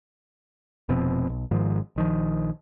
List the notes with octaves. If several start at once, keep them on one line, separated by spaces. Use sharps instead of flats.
F1 B2 F3 C4
B1
G#1 G#2 D#3 F3
A#1 D#3 F3